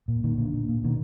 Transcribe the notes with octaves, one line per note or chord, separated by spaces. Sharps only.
A#2
A#2 D#3
A#2 D3
A#2
A#2
B2 D#3